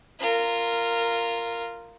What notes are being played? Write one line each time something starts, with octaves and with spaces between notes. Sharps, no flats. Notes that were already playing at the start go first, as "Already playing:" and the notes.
F4 A#4